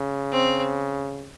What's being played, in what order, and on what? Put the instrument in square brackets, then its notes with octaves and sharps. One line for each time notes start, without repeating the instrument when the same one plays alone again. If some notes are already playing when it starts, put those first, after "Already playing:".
Already playing: [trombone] C#3
[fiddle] C4